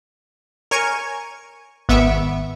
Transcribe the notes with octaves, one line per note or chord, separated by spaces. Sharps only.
A#4 C#5 G#5 C#6 C#7
G#1 B3 E5 C#6 D7